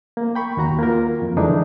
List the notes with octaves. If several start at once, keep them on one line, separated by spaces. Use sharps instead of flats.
A#3
G5 B5 C#6
D#2 F#4 A#5
A#3 F4 A#4
F2
D3 E3 G#3 D4 D#4